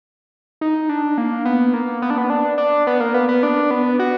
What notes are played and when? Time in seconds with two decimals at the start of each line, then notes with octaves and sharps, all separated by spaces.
0.61 D#4
0.89 D4
1.18 A#3
1.45 B3
1.74 A#3
2.02 B3
2.10 D4
2.18 B3
2.30 D4
2.58 D4
2.87 B3
3.00 A#3
3.14 B3
3.29 B3
3.43 D4
3.71 B3
3.99 F#4